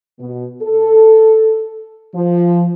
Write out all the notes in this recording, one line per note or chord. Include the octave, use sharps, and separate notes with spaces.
B2
A4
F3